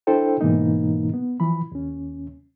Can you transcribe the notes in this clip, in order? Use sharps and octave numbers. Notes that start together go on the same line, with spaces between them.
D4 E4 A4 C5 G5
G#2 B2 E3 A#3 D#4
B3
E3 F3 B5
D#2 C#4